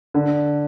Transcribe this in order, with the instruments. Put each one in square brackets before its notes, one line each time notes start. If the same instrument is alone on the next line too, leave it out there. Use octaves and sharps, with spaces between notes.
[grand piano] D3